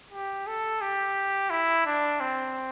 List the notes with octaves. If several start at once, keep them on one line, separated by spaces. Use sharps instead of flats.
G4
A4
G4
E4
D4
C4